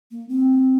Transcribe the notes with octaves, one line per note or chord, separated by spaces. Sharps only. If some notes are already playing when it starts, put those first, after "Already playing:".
A#3
C4